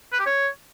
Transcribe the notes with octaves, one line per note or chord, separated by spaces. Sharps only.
B4
G4
C#5